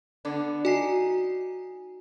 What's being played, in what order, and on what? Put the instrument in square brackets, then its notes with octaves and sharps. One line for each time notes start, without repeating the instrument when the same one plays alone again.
[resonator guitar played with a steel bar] D3 B3 D4
[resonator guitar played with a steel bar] D#4 [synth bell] F#4 G#5 C7